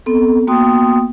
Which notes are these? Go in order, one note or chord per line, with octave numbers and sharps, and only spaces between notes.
B3 C4 A4
A#3 B3 F#4 G5 C6 D#6